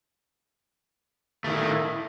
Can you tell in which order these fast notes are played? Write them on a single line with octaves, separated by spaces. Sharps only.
A3 D#3 E4